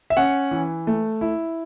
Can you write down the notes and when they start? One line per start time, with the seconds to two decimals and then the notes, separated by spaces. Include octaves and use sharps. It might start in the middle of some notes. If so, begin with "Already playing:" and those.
0.10 E5
0.17 C#4 F#5
0.51 E3
0.87 A3
1.21 E4